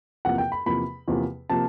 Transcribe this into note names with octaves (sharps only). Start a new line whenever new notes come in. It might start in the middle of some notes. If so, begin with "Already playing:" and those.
E2 C3 F3 A#3 F#5
G5
B5
E2 C3 F3 A#3 B5
E2 C3 F3 A#3
C3 F3 A#3 A5